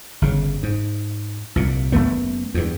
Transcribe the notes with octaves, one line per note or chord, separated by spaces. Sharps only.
G1 C#3
G#2
C2 A#2
F#1 G#2 A3 B3
E2 G2